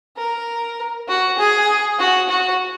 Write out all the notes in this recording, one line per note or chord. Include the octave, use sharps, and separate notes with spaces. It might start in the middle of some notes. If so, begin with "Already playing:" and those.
A#4
F#4
G#4
F#4
F#4